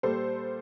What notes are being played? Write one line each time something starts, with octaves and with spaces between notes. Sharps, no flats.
A#2 G3 A4 C5